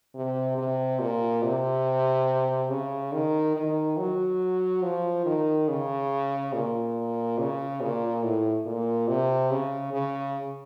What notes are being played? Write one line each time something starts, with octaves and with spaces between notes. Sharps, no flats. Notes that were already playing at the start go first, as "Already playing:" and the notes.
C3
C3
A#2
C3
C#3
D#3
D#3
F#3
F3
D#3
C#3
A#2
C#3
A#2
A2
A#2
C3
C#3
C#3